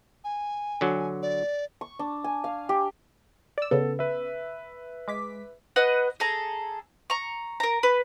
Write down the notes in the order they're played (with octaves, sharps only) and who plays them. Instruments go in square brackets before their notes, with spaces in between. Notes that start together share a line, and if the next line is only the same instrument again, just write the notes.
[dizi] G#5
[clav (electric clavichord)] D3 F#3
[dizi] D5
[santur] C#6
D4
G#5
F5
G4
[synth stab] D5 E6
[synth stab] C#3 B3 [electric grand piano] A4
[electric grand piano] B4 E5
[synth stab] G#3 D6 B6
[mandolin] B4 D#5 F#5
G#4 A4 A5 A#5
A#5 C#6
A#4 A#5
B4